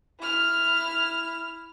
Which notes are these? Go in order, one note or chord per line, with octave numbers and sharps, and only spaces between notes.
E4 F6